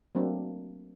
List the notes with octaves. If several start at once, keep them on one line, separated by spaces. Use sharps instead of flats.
F#3 A3 A#3 C4 D4